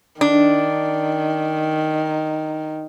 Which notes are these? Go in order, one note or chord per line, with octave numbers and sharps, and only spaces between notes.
D#3 D4